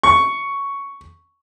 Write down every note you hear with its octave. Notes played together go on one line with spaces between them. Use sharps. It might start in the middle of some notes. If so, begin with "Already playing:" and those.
C#6